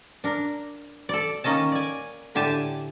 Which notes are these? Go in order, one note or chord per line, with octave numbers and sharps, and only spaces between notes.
D4 A#4
A4 D5
D#3 A#3 C#4 D#5 A5
D5 G#5
A2 D3 G4 G#5 A5